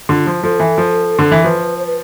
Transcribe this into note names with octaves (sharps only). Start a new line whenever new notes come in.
D3 F4
F3
F3 A4
E3
F3
D3
E3
F3 B4
C5
B4